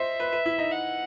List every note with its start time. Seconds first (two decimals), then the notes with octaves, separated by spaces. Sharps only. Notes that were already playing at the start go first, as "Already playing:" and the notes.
Already playing: C5 D#5 E5
0.20 B4
0.33 B4
0.46 E4
0.58 D#4
0.71 F#5